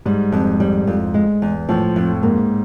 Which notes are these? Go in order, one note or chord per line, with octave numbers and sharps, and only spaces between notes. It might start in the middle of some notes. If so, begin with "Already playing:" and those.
G#2 G3
F2
G3
F2
G#3
E2
A2 F3
F2
G#2 A#3